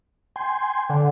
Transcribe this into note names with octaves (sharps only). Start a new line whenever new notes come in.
G5 G#5 C6
D3